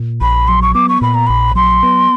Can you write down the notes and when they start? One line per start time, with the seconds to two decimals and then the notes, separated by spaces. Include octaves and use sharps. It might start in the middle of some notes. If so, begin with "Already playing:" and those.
Already playing: A#2
0.21 A#1 B5
0.48 F#3 C6
0.62 C#6
0.74 B3 D6
0.89 C#6
1.01 A#2 B5
1.14 A#5
1.27 A#1 B5
1.55 F#3 C6
1.83 B3